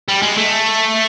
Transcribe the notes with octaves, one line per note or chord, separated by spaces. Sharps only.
G3
G#3
A3